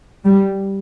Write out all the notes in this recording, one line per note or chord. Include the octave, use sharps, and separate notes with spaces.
G3